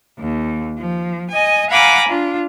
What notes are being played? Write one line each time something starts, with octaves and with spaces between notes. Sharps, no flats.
D#2
F3
D#5 G#5
F5 F#5 G#5 A#5 B5 D6
D4 F4